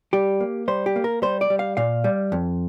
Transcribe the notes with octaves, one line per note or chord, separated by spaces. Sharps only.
G3 G4
A#3
G3 C5
G4
A#3
A#4
G3 C5
D5
G3
F5
A#2 F5
G3
F2